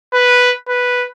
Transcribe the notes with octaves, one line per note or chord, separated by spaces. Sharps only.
B4
B4